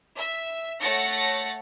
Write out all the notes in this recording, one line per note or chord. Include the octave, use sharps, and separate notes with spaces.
E5
A3 C#5 F#5 A6 A#6 C#7